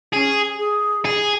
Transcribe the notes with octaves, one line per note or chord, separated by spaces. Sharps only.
C#4 G#4
G#4
G#4